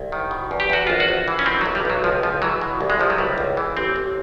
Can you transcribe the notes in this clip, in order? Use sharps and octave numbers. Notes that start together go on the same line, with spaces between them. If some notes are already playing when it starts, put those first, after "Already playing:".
Already playing: C2
D#3
B2
E2
G4
E2 F#4
A#1 F4
F#4
A#1
E3
C#4
B2 C4
F#3
B1
G3
B1 F#3
C#2 F3
C#2 F3
E3 F#3
B2
C2
G#3
C2 F3
F#3
C#2 G3
C#2
E3
A1 C4
A1